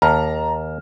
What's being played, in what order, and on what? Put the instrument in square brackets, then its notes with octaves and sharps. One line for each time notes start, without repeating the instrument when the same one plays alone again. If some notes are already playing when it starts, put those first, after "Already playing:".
[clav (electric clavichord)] D#2 [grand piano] A5 A#5 F6